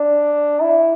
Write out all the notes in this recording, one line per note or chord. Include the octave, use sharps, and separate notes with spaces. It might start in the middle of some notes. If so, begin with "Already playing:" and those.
Already playing: D4
E4